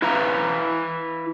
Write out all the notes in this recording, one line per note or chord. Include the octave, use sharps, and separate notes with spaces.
E4 B4 F5 A#5